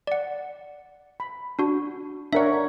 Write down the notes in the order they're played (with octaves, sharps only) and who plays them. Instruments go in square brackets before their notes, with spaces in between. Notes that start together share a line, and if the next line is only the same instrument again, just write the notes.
[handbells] D5 F#5
[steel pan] B5
[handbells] D4 F#4
[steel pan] D4 A#4 C#5 [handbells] E5 F#5